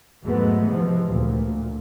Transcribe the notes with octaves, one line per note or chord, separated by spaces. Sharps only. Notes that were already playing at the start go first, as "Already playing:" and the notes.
E2 G#2 F#3 G#3 A3 B3
C3 E3 F3 G#3
D2 A#2